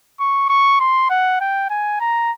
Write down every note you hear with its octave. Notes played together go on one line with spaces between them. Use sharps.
C#6
C#6
C6
F#5
G5
G#5
A#5